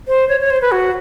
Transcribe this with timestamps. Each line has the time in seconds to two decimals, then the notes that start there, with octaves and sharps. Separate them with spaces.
0.08 C5
0.29 C#5
0.41 C#5
0.50 C5
0.62 B4
0.72 F#4